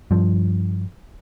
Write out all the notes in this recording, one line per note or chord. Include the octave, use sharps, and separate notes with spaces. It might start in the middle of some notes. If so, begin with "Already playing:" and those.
G2 F3